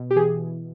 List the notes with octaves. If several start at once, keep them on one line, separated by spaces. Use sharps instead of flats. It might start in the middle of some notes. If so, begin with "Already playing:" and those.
Already playing: B2
G4
E3 G#4